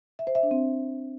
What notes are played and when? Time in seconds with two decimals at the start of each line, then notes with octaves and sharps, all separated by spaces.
0.19 E5
0.27 C5
0.35 E5
0.43 D4
0.51 C4